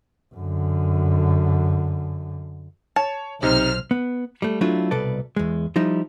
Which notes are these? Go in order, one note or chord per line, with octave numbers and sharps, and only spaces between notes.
F#2 D3
C#5 A5
B1 C3 D#4 C5 F6
B3
G3 A3
F#3 A3 D4 E4 F4
C2 B2 A4 B4 D5 A5
E2 G#3
F3 G3 D#4 E4